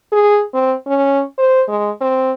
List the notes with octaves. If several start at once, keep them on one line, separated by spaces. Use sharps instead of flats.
G#4
C4
C#4
C5
G#3
C4